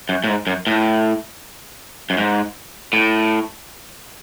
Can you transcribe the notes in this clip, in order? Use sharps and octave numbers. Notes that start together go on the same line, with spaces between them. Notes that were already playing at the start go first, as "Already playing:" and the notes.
F#2
A2
G#2
F#2
A2
F#2
G#2
A2